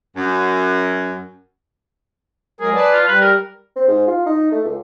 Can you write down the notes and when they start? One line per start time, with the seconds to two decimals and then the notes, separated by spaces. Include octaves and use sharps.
0.16 F#2
2.61 F#3 G#3 G#4 A#4
2.75 B4 D5 A5
2.92 F4
3.08 G3 B4
3.22 A#4
3.76 C4
3.88 G#2
4.07 F4
4.26 D#4
4.52 A3
4.64 C#2